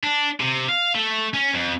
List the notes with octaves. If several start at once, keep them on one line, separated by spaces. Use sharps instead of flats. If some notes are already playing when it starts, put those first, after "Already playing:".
D4
C3
F5
A3
C#4
F2